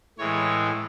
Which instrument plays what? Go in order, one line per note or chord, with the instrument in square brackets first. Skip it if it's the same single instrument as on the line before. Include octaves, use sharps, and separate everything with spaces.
[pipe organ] A2 E3 G#3 C#5